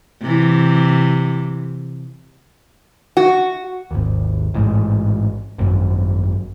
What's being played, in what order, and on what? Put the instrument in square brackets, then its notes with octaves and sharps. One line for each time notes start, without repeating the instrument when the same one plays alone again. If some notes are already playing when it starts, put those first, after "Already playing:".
[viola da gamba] C3 E3
[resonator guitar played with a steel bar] F#4
[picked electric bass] G#1 D#2
A1 G#2
G#1 F#2